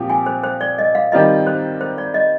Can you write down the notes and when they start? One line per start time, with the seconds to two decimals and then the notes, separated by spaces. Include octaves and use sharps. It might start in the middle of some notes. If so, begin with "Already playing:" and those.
Already playing: A#2 F3 C4 G4
0.10 G#5
0.26 C5
0.44 C5
0.61 D5
0.78 D#5
0.95 F5
1.12 D#3 G3 C4 F4 A#4 D#5
1.47 C5
1.81 C5
1.98 D5
2.14 D#5